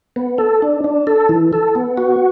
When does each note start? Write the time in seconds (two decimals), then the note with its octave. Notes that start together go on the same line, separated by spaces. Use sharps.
0.16 B3
0.38 A4
0.62 D4
0.84 D4
1.07 A4
1.29 E3
1.53 A4
1.75 B3
1.97 F#4